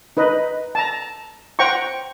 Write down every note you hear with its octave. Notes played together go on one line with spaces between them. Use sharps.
D#4 B4 D#5
A5 A#5
C5 F#5 G5 A#5 C#6